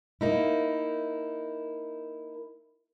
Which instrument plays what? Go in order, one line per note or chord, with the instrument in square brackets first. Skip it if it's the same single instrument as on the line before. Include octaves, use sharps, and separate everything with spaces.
[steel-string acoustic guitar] A#3 D#4 E4